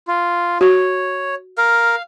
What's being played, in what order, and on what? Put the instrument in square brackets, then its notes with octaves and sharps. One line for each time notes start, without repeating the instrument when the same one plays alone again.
[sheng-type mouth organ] F4
[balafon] F#4 [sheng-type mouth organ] C#5
[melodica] A#4 [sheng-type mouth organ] F5